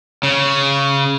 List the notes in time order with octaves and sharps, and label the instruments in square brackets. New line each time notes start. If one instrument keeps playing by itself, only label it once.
[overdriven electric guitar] C#3